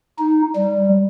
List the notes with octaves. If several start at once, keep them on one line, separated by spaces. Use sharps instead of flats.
D#4
G3